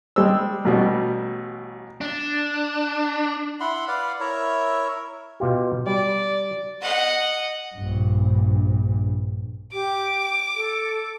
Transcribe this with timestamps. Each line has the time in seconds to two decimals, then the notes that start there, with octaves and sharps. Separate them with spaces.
0.16 G3 G#3 G4 C5 E6
0.65 A1 B2 G3
2.01 D4
3.60 E4 F#5 B5 C6
3.88 B4 D5 F5 F#5
4.20 E4 A#4 C#5 E5
5.40 B2 F4 G4
5.87 G3 D5
6.82 D#5 F#5
7.76 A#1 G2
9.73 G4 D6
10.56 A4